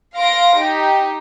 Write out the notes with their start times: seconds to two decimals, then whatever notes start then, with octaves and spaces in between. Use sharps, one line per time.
0.16 F5 C6 A#6 D7
0.57 D#4 G4